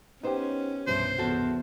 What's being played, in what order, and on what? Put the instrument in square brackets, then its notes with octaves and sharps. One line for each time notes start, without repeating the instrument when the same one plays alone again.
[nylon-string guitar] B3 C5 [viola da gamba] C#4 [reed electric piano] D#4 G4
[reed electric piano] C2 G2 B2 [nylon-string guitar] E3 F3 [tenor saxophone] C5
[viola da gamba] E2 [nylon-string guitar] F#4 A4